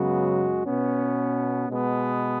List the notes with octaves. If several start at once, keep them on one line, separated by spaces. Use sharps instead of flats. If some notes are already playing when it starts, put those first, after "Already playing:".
Already playing: F#2 C#3 F#3 G#3 B3 F#4
B2 B3 C#4
B2 G#3 B3